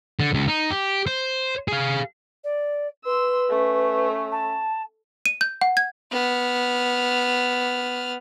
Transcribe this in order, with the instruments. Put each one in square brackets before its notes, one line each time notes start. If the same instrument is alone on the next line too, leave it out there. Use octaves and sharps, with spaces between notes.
[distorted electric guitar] D3
C#2
D#4
G4
C5
G#4 F5
[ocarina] D5
[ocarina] B4 [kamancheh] C6 E6
[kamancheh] A3 C#4
[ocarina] A5
[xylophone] D#7
G6
F#5
G#6
[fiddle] B3 F6